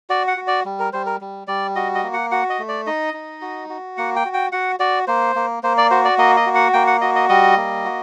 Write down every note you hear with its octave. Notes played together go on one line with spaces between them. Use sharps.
F#4 D5
F#5
F#4
D5
G3
A#4
G3 C5
A#4
G3
G3 D5
F#4 D#5
D#5
A#3
F#5
F#4 F#5
D#5
A3
D5
D#4 D#5
D#4
F#4
F#4
A#3 F#5
G5
F#4
G5
F#4 F#5
F#4 D5
A#3 C5
A#3
A#3 C5
D5
F#4 C5
D5
A#3 D#5
D#5
F#4
F#5
A#3 G5
F#5
F#4 D#5
D#5
G3 D#5
A#3
F#4